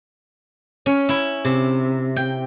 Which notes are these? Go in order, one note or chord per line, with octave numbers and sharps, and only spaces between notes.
C#4
E4
C3
G5